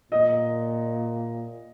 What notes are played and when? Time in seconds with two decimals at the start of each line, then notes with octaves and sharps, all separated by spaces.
0.12 A#2 D#5